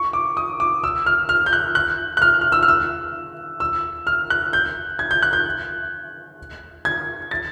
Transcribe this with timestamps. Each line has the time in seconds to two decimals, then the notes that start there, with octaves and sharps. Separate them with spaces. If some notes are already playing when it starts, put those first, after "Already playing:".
Already playing: C#6
0.13 D6
0.37 D#6
0.60 D6
0.84 E6
1.06 F6
1.29 F6
1.46 G6
1.53 F#6
1.75 F#6
2.17 F#6
2.22 F6
2.41 F6
2.52 E6
2.63 F6
2.68 E6
3.60 E6
4.07 F6
4.30 F#6
4.53 G6
4.99 G#6
5.11 G6
5.23 F#6
5.33 G6
6.85 G#6
7.31 A6